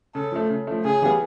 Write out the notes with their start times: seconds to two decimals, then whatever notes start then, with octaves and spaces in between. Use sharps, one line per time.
0.15 C#3 A4
0.32 F3 A3
0.50 C#3
0.67 F3 A3
0.84 C#3 G#4
1.02 E3 G3 B3